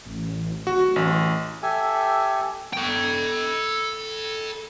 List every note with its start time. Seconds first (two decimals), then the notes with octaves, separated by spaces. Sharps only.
0.06 A1
0.67 D1 F#4
0.96 A1
1.63 G4 A4 E5 G#5
2.73 A4 G5